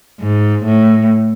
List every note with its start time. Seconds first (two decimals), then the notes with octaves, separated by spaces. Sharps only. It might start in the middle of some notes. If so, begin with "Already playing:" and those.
0.20 G#2
0.65 A2